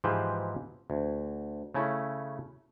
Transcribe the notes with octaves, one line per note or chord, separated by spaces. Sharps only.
G#2 E3 F3 G4 B4 C5
D2
C#3 A3 C#4 E4